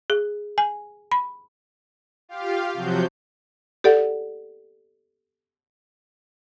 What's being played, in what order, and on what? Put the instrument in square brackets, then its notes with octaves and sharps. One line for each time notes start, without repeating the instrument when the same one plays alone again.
[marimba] G#4
G#5
B5
[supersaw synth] F4 G4 F5
C3 F3 F#3 F#4 G6
[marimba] G4 A4 D5 F#5